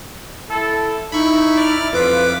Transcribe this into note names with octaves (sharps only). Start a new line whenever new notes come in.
E4 A4
D#4 E4 B5 C#6
D5 F6
F2 E4 F4 B4 F5 D6 B6